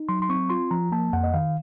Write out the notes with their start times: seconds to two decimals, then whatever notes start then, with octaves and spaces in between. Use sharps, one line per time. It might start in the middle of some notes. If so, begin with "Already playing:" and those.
Already playing: D#4
0.09 F#3 C6
0.22 C6
0.29 C4 C#6
0.50 F4 C6
0.71 F3 A#5
0.92 A#3 A5
1.13 F2 F#5
1.24 D#5
1.34 D#3 F5